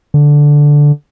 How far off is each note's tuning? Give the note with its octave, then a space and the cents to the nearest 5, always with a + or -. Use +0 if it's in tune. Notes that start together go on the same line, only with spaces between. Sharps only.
D3 -5